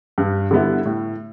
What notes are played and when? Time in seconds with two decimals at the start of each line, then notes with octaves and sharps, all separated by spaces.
0.18 G2
0.51 D3 G3 B3 E4
0.85 A2